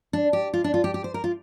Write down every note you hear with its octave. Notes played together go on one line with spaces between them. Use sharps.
D4
G4
F4
D4
F4
G4
G4
C5
A#4
F4